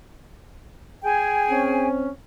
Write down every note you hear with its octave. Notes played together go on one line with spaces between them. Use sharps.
G#4 G5 G#5
C4 C#4